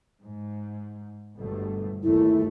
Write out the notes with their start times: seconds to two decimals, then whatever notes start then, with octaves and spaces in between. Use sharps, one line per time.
0.21 G#2
1.37 G1 B2 A3
2.03 G1 D#2 A3 E4